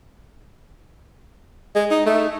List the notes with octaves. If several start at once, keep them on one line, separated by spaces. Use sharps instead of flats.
G#3
D#4
A3